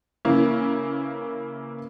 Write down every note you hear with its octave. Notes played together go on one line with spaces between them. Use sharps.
C#3 E3 A#3 C#4 E4